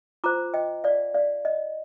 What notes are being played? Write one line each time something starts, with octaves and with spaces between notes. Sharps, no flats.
F4 C5 A#5 D6
D#5 G5
D5 F5
D5 F5
D#5